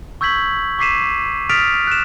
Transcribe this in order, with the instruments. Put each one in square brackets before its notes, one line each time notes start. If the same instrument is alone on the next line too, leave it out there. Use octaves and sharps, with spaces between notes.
[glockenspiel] C#6 E6 G6 G#6 B6 F#7
C#6 D6 B6 C7 D#7 E7
D#6 F6 A6 B6 D7 F7
F#6 E7